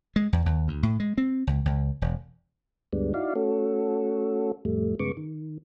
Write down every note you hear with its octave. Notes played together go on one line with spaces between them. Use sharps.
G#3
E2
D#2
D2
A2
G#3
C4
C#2
C#2
E1
D2 G2 G3 G#3 B3 D4
D#4 E4 F#4 D5 F5
A3 C#4 F#4 A4
F2 A2 G3 A3
G2 C#3 G#3 B3 C#6 D6
D#3